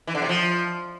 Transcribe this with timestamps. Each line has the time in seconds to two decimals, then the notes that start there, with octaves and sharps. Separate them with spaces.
0.07 E3
0.15 D3
0.22 C3
0.29 F3